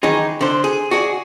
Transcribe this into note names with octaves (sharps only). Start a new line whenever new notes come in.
D#3 E3 D#4 G#4
D3 C5
G#4
F#4 G#4 D5